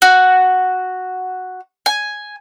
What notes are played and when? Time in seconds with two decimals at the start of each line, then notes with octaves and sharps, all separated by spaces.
0.02 F#4
1.86 G#5